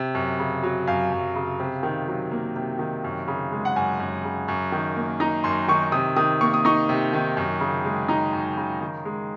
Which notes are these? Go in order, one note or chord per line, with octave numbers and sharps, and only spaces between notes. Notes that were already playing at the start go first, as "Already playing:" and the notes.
Already playing: C3
F#2
C#3
F#3
F#2 F5
F#2
C#3
C3
D#3
F#3
A#3
C3
D#3
F#2
C#3
G#3
F#5
F#2 G#5
F#2
C#3
F#2
D#3
A#3
D#4 A#5
F#2 C6
D#3 C#6
C3 D#6
D#3 D#6
A#3 C#6
D#6
D#4 C#6
C3
D#3
F#2
C#3
G#3
D#4 A#5
F#2
C#3
D#3
G#3